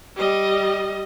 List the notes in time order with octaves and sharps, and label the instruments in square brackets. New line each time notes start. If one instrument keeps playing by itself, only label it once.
[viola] G3 D#5